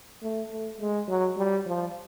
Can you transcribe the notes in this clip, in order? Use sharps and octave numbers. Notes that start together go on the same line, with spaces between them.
A3
A3
G#3
F#3
G3
F3